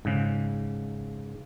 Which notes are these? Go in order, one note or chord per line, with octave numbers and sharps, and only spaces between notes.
G#2 C#3